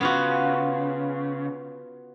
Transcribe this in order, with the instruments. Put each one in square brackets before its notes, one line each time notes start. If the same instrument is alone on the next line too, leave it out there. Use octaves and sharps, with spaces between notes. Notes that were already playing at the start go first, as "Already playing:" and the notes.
[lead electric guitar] C#3 [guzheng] B3 F4 F#4